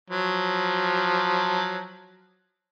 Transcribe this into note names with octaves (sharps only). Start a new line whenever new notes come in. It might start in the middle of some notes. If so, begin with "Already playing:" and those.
F3 F#3